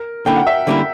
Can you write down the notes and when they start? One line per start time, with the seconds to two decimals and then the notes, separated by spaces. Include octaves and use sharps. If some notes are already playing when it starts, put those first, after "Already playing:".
Already playing: A#4
0.26 D3 A#3 C#4 E4 G5
0.36 F#5
0.47 E5
0.67 D3 G3 A#3 C#4 E4